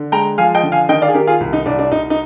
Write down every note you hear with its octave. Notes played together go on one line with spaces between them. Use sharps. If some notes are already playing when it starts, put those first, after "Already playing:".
Already playing: D3
G#3 G5 A#5
F3 F5 G#5
D#5 G5
D3
F5 G#5
D#3 D#5 G5
D5 F5
G#4
D#3 G4 A#4
F4 G#4
C2
D#4
C2 D4
D4
C2 D#4
D#4